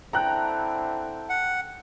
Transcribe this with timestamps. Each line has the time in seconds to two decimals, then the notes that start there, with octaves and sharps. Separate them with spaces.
0.13 D3 C4 E4 A4 G5 A#5 F#6
1.29 F#5